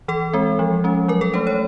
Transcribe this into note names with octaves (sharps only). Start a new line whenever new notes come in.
E3 A4
G#3 C4
F3
G#3 C#4
F#3 A#4
A4
A3 D4 C5
C#5